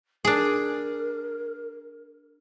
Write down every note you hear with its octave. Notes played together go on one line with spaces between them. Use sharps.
D4 G#4 A#4